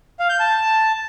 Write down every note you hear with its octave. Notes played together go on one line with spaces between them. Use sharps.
F5
G6
A5